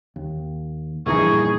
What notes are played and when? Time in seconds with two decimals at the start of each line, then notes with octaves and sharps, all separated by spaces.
0.16 D#2
1.06 A#1 E2 G2 A#2 E3 D#4 G#4 C#6